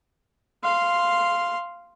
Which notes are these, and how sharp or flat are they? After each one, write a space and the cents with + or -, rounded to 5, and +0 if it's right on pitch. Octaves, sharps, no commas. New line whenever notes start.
F5 -10 C6 +0